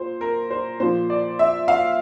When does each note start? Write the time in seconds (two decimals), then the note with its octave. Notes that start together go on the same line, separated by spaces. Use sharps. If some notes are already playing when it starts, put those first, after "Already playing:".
Already playing: A#2 C5
0.21 A#4
0.51 C5
0.80 A#2 F3 C5
1.10 D5
1.39 E5
1.68 F5